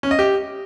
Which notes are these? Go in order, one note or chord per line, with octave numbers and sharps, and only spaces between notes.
C#4
D#5
G4